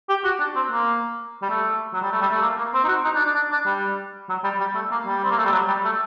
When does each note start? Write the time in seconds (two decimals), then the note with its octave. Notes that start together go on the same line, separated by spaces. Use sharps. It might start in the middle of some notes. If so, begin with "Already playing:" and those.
0.09 G4
0.24 F#4
0.40 D4
0.56 C4
0.71 A#3
1.43 G3
1.49 A3
1.94 F#3
2.02 G3
2.12 A3
2.21 G3
2.31 A3
2.42 A#3
2.58 A#3
2.74 C4
2.84 D#4
2.88 F#4
3.05 D#4
3.15 D4
3.25 D4
3.36 D4
3.52 D4
3.66 G3
4.29 F#3
4.44 G3
4.60 G3
4.75 A3
4.92 A#3
5.07 G3
5.24 C4
5.31 A#3
5.38 A3
5.45 G3
5.53 F#3
5.68 G3
5.85 A3